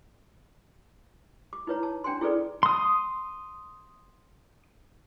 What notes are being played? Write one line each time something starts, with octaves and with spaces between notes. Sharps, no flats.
D6
D#4 E4 B4 C#5 A#5
A5
C#4 D4 G5 G#5 C6
E4 G#4 A4 B4 D5
C6 D#6